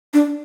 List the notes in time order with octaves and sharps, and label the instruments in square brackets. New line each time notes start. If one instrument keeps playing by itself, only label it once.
[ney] D4